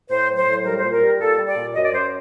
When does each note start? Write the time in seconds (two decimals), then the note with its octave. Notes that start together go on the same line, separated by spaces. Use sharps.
0.10 A2 C5
0.29 F#3
0.37 C5
0.47 A2
0.64 G3 A#4
0.78 A#2 C5
0.92 A#4
1.02 G3
1.20 A#2 A4
1.38 G3
1.48 D5
1.56 A#2
1.75 F#2 D#5
1.84 D5
1.93 F#2 C5